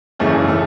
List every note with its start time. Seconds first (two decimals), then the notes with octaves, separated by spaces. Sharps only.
0.19 G#1 F#2 C#3 E3 A3
0.47 C#3 E3 A3